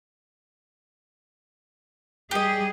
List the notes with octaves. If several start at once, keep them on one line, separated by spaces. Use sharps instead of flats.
G3 G4 G#4 D#5